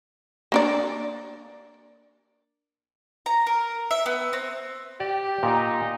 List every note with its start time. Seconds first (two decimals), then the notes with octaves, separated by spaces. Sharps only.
0.52 A#3 D4 D5
3.26 A#5
3.47 A#4
3.91 E5
4.06 B3
4.33 C4
5.00 G4 D5
5.43 A#2 D#4 A#4